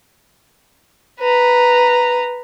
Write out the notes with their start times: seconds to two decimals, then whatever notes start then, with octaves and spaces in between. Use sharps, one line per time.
1.20 B4 A#5